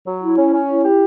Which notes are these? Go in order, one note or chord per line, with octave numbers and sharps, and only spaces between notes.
F#3
E4
C#4
C#4
E4
G4